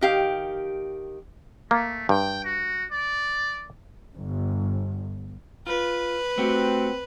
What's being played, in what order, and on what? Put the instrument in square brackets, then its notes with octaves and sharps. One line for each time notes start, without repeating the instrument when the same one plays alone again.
[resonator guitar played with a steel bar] D#3 G4 F5
[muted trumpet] A3 [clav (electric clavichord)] A#3
[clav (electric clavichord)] G2 [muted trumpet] G5
[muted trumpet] F#4
D5
[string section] G1
[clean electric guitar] F4 [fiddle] B4
[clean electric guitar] A3 F#4 G4 [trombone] C4